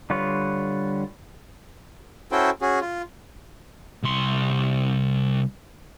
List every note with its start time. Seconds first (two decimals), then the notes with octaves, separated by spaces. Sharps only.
0.10 D3 G3 F4 B4 C#5
2.32 C#4 E4 F#4 A4 C5 G5
2.61 C#4 F#4 G#4
2.81 F4
4.03 C2 C6